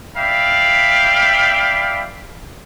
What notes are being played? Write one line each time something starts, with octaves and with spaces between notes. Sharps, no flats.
D5 E5 F5 G5 B5